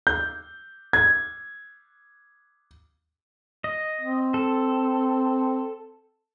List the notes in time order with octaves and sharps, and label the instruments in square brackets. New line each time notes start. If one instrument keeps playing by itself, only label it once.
[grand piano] G6
G#6
[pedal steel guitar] D#5
[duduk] C4
[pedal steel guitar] A4